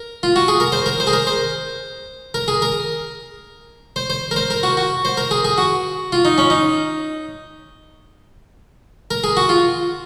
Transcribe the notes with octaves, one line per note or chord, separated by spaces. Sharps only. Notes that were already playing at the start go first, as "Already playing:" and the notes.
Already playing: A#4
F4
F#4
G#4
A#4
C5
A#4
C5
G#4
A#4
C5
A#4
G#4
A#4
C5
C5
A#4
C5
A#4
F#4
F#4
C5
A#4
G#4
G#4
F#4
F4
D#4
C#4
D#4
A#4
G#4
F#4
F4